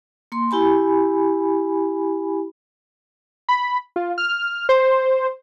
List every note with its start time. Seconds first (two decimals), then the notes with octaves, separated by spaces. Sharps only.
0.32 A#3 C6
0.51 E4 G4 G#5 B5
3.49 B5
3.96 F4
4.18 F6
4.69 C5